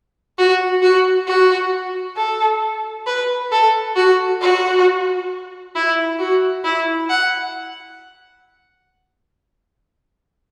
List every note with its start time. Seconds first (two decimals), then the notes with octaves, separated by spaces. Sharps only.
0.38 F#4
0.82 F#4
1.27 F#4
2.17 A4
3.06 B4
3.52 A4
3.96 F#4
4.41 F#4
5.76 E4
6.19 F#4
6.64 E4
7.10 F#5